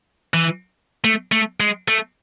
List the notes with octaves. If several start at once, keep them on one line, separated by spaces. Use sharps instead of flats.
E3
A3
A3
G#3
A3